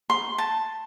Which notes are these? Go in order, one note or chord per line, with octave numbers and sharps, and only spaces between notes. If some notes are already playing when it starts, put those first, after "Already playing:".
C6
A5